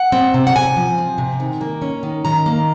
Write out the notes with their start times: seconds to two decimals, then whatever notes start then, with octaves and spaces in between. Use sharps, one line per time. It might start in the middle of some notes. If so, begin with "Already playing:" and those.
Already playing: F#5
0.12 C4
0.34 C3
0.47 F#5
0.55 C3 G#5
0.76 F3
0.98 C4
1.18 C3
1.40 D#3
1.61 A#3
1.82 C#4
2.03 D#3
2.25 D#3 A#5
2.46 A#3